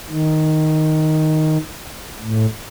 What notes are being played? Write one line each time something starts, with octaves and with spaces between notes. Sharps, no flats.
D#3
A2